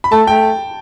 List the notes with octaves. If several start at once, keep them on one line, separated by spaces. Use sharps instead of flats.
B5
A3 A5
A3 G5